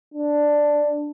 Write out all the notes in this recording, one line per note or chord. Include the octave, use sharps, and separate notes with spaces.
D4